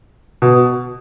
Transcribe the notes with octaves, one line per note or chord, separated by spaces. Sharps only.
B2